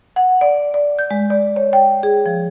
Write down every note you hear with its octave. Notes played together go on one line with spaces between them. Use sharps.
F#5
D5
D5
G6
G#3
D5
C#5
G5
G#4
F3